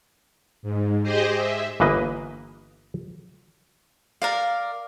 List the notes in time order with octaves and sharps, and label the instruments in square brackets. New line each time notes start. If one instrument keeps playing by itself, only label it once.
[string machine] G#2
G4 G#4 C5 D#5
E5
[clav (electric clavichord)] G1 E3 A#3 B4 D#5
[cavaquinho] A#4 D5 F5